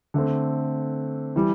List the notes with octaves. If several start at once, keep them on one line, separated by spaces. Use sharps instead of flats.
D3 A3 C4
E3 G3